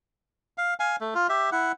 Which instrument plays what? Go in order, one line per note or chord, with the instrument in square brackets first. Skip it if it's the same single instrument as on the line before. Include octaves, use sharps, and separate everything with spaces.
[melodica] F5
F5 G#5
A3
F4
G4 E5
E4 F#5